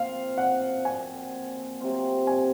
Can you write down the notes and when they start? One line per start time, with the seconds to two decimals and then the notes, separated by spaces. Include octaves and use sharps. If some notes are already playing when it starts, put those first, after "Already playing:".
Already playing: F3 A#3 C4 F4 F5
0.38 F#5
0.85 A#2 F3 C4 F#4 G#5
1.80 C3 F#3 C4 F4
2.27 G#5